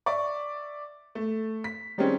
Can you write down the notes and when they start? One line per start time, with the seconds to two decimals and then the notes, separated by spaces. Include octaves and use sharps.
0.06 D5 E5 C#6 D6
1.15 A3
1.64 B6
1.98 D#3 G3 G#3 C4 C#4